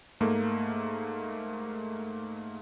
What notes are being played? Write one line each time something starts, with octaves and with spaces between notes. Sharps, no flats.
G#2 A3 A#3